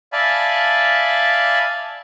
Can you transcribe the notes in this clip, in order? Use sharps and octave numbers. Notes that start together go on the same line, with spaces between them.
D5 E5 F5 G#5 A5 B5